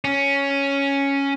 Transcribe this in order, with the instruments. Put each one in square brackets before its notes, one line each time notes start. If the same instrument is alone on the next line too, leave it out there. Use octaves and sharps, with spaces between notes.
[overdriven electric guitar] C#4